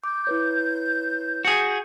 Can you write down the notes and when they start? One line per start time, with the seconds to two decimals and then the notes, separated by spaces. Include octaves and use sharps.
0.04 D6 G6
0.27 E4 B4 C#5
1.45 F#4 G#4